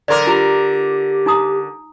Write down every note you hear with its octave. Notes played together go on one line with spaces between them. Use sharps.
D3 A#4 D5 C6 D6
F4 G4 A#5
D#4 A#5 D#6